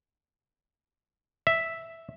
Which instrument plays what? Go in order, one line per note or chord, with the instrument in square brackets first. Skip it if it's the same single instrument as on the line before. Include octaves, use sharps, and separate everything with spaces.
[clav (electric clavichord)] E5